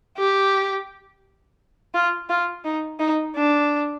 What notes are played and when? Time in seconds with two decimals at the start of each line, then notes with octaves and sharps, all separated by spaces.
0.18 G4
1.94 F4
2.29 F4
2.64 D#4
2.99 D#4
3.36 D4